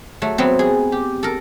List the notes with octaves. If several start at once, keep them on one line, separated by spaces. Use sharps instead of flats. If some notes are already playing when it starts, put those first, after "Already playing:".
F#3 A3
F#3 B3 C4
G#4
G4
A4 A#4